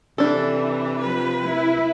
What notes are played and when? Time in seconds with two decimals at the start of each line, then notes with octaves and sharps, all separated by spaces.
0.18 C3 E3 D4 A4
1.01 F3 B4
1.47 E4